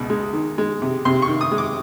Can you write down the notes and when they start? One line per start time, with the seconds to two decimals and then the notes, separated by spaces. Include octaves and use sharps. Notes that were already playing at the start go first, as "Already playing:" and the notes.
Already playing: C#2 B2
0.10 G#3
0.33 D#3
0.58 G#3
0.82 C3
1.05 C3 C6
1.22 C#6
1.28 D#3
1.41 D#6
1.51 G#3
1.58 D6